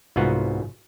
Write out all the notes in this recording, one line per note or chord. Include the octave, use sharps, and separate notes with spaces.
C2 G#2 B3 F4 F#4 B4